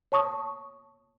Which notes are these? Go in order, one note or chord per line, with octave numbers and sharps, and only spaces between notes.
C#5 A5 C#6 D#6